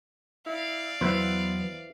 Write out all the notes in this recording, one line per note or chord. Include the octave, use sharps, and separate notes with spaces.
E4 D5 F5
E2 F#3 B3 E4 B4 C5